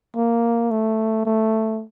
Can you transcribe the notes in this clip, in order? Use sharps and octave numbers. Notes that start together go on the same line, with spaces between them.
A#3
A3
A3